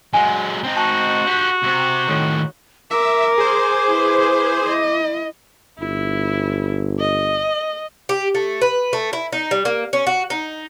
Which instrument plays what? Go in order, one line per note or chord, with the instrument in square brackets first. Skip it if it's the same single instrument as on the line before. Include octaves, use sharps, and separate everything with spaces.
[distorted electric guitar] F#3 G#3 [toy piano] F#5 G#5
[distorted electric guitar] C4 D#4
[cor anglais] F#4 [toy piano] A5 C#6
[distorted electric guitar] G4 F#5
C3 C4
[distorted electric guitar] A2 D#3 [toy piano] A4 C#5
[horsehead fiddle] A#4 [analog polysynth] E5 [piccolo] D6
[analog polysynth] G#4 C5
[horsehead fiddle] E4 B4
E4 D#5
[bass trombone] G1 [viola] E4
[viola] D#5
[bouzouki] G4
A3
B4
A3
E4
D#4
G3
A#3
C#4
F#4
D#4